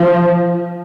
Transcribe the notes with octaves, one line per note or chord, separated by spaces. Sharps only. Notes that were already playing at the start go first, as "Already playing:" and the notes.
Already playing: F3